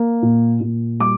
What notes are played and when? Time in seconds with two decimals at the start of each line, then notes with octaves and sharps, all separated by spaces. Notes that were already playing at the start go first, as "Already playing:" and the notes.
Already playing: A#3
0.22 A#2
0.61 A#2
1.00 G3 D6